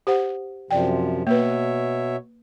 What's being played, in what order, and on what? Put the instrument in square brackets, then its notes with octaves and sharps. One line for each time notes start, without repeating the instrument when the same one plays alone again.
[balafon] G4 C5 F#5
[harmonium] F#2 C3 F3 [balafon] D5 G5
[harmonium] B2 C#5 E5 [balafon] A#3 B4